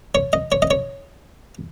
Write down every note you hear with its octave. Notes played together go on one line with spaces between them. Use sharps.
C#5
D#5
C#5
D#5
C#5